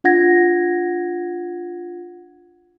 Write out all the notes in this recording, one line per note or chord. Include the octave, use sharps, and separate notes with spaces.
D4 F4 F#5 G#6 A#6